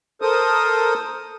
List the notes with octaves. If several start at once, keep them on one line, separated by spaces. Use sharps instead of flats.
A4 A#4 C5 D#6